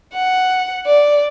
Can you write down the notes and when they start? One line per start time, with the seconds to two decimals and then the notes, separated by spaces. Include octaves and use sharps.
0.14 F#5
0.86 D5